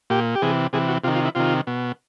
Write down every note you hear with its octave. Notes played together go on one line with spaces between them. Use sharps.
A#2 G4
G4
C3 E3 G#4
C3 E3 G#4
F#4
C3 D#3 F4
F4
E4
C3 D#3 F4
B2